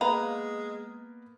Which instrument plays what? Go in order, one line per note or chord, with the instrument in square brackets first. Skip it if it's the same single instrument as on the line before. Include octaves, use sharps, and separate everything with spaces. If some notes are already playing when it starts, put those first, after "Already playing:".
[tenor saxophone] G#3 [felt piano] A#3 B3 A#4 [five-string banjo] B4 F5 A#5